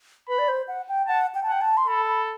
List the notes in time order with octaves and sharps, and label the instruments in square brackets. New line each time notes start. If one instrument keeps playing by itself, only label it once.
[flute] B4 [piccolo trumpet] B5
[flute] D5
C5
F#5
G5
[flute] F#5 [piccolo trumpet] A5
[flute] G5
A5
[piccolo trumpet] F#5 [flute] G5
[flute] A5
C6
[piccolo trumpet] A4 [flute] B5
[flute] B5